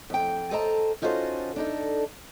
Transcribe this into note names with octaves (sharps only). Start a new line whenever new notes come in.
F2 G5
A4 C5 D#5 G5 A5 A#5
C#4 D#4 F4 F#4 A4 C5
D4 D#4 A4